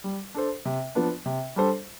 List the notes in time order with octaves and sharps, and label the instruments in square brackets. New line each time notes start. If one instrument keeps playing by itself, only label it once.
[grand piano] G3
D4 A4 C5
C3
F3 B3 D4
C3
G3 D4 A4 C5